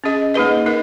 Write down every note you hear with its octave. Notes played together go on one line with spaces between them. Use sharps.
C#4 G#4 D#5
A#3 D#4 G#4 B4 D#5
D#4 A#4 D#5